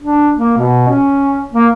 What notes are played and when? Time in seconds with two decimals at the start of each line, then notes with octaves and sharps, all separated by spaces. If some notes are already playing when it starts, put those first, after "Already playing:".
0.01 D4
0.36 A#3
0.58 B2
0.88 C#4
1.54 A#3